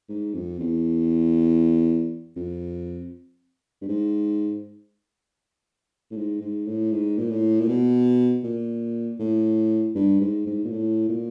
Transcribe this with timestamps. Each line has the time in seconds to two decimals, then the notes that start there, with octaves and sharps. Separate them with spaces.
0.09 G#2
0.34 F2
0.60 E2
2.36 F2
3.81 G2
3.89 G#2
6.11 A2
6.17 G#2
6.41 G#2
6.66 A2
6.92 G#2
7.18 A#2
7.31 A2
7.61 A#2
7.68 B2
8.44 A#2
9.20 A2
9.95 G2
10.21 G#2
10.47 G#2
10.65 A#2
10.71 A2
11.09 A#2